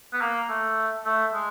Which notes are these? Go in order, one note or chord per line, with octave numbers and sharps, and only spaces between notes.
B3
A#3
A3
A3
G#3